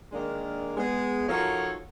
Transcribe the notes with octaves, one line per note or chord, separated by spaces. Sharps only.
D#3 G#3 A#3 D4
G#3 B3
F3 D#4 F#4 A4 A#4 C#5